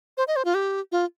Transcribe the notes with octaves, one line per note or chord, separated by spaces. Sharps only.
C5
D#5
C5
F4
G4
F4